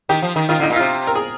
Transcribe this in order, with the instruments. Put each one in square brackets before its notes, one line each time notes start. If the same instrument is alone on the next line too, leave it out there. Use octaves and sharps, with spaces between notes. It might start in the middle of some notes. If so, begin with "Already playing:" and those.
[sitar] D#3 [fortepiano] G4
[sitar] F3
D#3
[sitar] D#3 [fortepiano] F4
[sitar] D3
[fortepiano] D#4
[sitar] A#2
[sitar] C3 [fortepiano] F4
[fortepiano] A#4
G#4